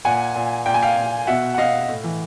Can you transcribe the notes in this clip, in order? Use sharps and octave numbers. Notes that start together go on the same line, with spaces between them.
A#2 F#5 G#5
A#2
A#2 G5
G#5
F5 G5
A#2
B2 E5 F#5
F#5
B2 D#5 F5
A2
E3